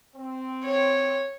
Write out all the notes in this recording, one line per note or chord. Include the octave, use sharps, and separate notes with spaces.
C4
C#5